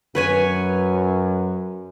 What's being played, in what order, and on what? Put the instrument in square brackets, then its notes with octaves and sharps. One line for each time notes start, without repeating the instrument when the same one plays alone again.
[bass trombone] F#2 [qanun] B4 C#5 G#5